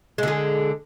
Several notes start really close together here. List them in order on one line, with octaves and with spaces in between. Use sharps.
G#3 D3 G#4